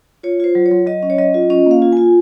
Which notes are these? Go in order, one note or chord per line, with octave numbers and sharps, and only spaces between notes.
F4 C#5
F4 C5
F#3
C#5
F#3
F#3 D#5
C#4
C#5
F#3 D#5
F4
C#4 D#5
A#3 F5
F4
F4 G#5